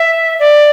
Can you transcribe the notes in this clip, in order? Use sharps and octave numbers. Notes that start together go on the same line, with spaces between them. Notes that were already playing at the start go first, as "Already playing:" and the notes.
Already playing: E5
D5